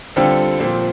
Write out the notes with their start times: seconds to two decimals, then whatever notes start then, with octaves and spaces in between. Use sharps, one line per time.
0.16 D3 G3 C4 F4 A4
0.59 A#2 F3 C4